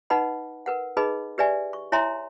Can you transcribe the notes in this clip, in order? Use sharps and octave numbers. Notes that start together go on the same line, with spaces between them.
D#4 B4 D#5 F#5 B5
A#4 B4 F#5
D#4 G#4 B4 D#5 B5
G4 B4 D5 E5 G#5
C#6
E4 C#5 E5 G#5 A#5 C6